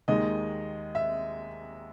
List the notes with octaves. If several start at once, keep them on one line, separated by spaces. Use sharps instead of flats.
D#2 D#3 G#3 D#5
E5